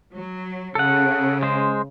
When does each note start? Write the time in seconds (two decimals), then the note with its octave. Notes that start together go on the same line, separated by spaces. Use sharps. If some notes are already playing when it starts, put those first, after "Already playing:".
0.15 F#3
0.75 C#3 A4 F#5
1.43 G#3 C5